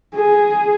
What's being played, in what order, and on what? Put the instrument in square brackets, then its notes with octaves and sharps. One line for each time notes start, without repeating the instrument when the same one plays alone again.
[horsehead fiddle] G#4